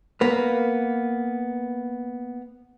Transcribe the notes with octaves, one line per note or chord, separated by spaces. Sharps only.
A#3 B3 B4